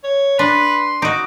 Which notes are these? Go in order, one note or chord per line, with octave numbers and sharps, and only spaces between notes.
C#5
D4 B4 C6
D#4 F#4 D6